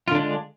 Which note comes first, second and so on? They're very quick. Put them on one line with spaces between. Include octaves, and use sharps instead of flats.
F4 D3 D4 G#3